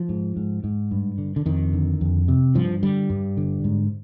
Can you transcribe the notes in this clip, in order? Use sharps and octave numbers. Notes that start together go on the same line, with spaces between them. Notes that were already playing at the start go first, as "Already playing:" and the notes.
Already playing: F3
G#2
G#2
G#2
G2
D3
D3
F2 D#3
D3
F2
C3
G2 F3
D3 G3
G2
D3
G#2